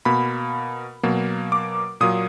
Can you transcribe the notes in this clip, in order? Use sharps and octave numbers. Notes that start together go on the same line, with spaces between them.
B2 A#3 B5
B2 F#3 A#3
D6
A#2 F#3 A#3 D#6